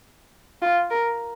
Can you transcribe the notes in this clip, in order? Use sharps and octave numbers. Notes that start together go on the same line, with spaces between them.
F4
A#4